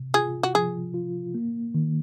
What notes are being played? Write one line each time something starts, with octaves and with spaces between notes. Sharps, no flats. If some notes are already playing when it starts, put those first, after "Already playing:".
Already playing: C3
F4 G#4
F#4
F3 G#4
F4
A#3
D#3